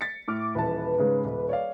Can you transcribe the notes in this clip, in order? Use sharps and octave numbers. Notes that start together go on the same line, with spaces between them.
A6 B6 C#7
A2 D6 F6
D#1 E3 B4 A5
G#2 C#3 G#3
D#1
C#5 D5 F5